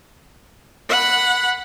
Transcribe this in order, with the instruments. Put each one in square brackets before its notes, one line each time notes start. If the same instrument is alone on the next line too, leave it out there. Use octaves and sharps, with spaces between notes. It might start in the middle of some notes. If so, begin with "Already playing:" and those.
[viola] F#5 B5